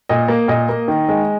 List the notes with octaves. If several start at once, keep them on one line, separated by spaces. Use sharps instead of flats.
A#2 D#5
A#3
A#2 D#5
A#3
D#3
G#3